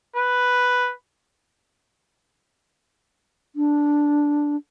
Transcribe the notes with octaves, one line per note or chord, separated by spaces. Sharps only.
B4
D4